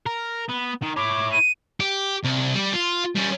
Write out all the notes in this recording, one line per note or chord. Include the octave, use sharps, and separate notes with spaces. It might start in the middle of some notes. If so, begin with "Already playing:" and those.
A#4
B3
D#3
E4 C#5 D6
D#7
G4
C2
G3 G4
F4
G3 C#4